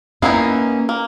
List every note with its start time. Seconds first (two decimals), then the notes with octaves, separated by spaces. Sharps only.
0.22 A#3 B3 C#4 D#4 E4 F5
0.89 A#3